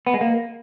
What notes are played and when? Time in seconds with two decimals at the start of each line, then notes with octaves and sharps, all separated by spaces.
0.07 B3
0.14 G#3
0.21 A#3